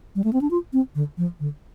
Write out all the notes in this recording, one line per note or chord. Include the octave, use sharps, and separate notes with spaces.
G3
A3
C4
D4
F4
C4
D3
F3
D3